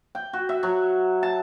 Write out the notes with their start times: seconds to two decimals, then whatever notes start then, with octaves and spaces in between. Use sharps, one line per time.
0.15 G5
0.33 F#4
0.49 E5
0.63 F#3
1.23 A5